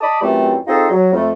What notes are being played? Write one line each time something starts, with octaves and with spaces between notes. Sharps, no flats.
D5 D#5 A5 B5 D6 D#6
F#2 E3 G3 A3 C4 F4
C4 D#4 F4 G#4 A4 D#5
F#3
F2 A3